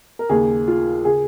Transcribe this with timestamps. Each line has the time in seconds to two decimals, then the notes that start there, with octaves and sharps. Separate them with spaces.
0.19 A#4
0.29 D#2 C#3 G#4
0.68 F4
1.05 C#3 G#4